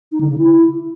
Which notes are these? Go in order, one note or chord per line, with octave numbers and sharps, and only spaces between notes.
D#4
D3
C#3
E4